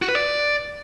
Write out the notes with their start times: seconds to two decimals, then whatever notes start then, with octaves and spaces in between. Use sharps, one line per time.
0.02 F#4
0.09 B4
0.15 D5